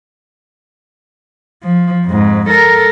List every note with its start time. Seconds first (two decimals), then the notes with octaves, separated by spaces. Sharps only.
1.64 F3
2.06 F2 G#2
2.49 A4 A#4